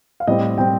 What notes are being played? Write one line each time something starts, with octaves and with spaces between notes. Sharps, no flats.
F5
A2 G3 C4 D#5
A2 G3 C4 G5